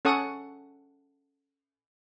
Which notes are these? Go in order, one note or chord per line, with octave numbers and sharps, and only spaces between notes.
C#4 A4 F#5 C#6 D#6